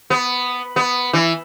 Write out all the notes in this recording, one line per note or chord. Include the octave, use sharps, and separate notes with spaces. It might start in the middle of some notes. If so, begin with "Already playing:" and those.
B3
B3
E3